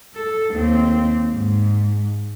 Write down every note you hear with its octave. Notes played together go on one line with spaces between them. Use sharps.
A4
D#2 C4
G#2